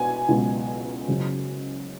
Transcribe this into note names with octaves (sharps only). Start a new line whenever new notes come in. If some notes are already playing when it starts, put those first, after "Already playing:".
Already playing: B2 G#5
C#2 B2 F#3
F#1 F#2 C#3 F#3